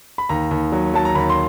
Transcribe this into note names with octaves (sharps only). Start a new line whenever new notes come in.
B5
D#2 A#5
D#2
F#3
F#3 A5
A#5
D#2 B5
C6